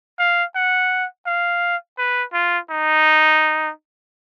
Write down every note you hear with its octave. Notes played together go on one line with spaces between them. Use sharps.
F5
F#5
F5
B4
F4
D#4